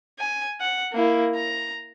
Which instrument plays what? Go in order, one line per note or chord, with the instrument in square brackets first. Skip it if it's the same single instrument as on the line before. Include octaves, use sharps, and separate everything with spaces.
[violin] G#5
F#5
A#3 E4
A#5